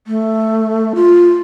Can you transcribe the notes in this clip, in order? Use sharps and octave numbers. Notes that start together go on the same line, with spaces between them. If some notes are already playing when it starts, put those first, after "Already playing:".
A3
F4